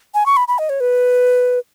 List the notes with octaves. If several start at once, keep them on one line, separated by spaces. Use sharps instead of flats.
G#5
C#6
B5
B5
D#5
C#5
B4